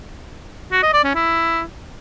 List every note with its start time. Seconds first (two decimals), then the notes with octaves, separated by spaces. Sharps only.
0.72 F#4
0.83 D#5
0.93 D5
1.04 C#4
1.15 E4